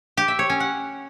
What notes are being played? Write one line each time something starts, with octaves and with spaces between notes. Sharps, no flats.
G4
E5
C#5
C#4
F#5